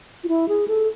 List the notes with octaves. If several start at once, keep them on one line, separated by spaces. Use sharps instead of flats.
F4
E4
G#4
A4